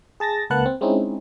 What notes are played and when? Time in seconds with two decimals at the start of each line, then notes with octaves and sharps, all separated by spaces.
0.20 G#4 A5 A6 A#6
0.50 C#2 A#3 B4 F#5 A5 F#6
0.66 C4
0.81 G#3 C4 C#4 D#4 E4